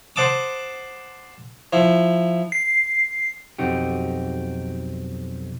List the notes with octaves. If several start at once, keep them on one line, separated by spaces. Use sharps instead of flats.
C5 F#5 A5 D6 D#6
F3 E4
C7
B1 F2 C4 D#4 F#4 G4